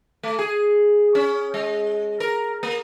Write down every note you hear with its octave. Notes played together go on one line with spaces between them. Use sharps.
A3
G#4
C#4
G#3
A#4
A#3